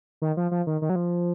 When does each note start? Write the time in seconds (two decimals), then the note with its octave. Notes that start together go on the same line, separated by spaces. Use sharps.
0.22 D#3
0.37 F3
0.51 F3
0.67 D#3
0.82 D#3
0.90 F#3
0.96 F3